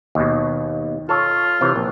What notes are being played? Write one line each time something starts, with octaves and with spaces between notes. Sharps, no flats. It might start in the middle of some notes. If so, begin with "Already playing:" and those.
D#2 B2
F4 A4 C#5 A5
C3 E3 C#5
A#1